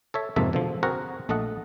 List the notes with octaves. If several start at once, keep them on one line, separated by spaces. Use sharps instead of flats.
A4 C#5 E5
F2 G#2 C3 A#3 A4 E5
B2 D3 F3
C4 F#4 G#4 A#4 F#5 A#5
A#1 A3 A4 D#5 F#5